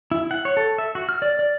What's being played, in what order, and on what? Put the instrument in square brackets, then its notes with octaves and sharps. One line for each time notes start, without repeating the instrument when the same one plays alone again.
[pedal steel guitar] E4
F#5
C#5
A4
E5
F#4
F6
D5
D5